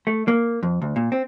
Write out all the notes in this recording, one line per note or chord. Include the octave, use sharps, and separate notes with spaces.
A3
A#3
F2
D2
A#2
C4